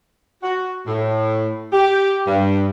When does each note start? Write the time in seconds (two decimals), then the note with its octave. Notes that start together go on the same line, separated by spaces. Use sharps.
0.43 F#4
0.87 A2
1.73 G4
2.27 G2